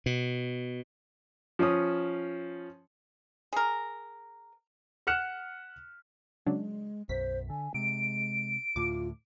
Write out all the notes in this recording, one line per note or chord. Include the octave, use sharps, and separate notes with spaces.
B2
F3 C#4 C#5 D#6
G#4 A#4
F#5 F6 F#6 C#7 E7
C#3 F#3 G#3 D4
B1 F#2 C5 B6
D3 G#5
C3 G#3 D7
D2 A2 F4 D6